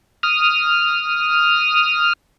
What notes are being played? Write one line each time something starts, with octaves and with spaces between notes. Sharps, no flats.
D#6 F6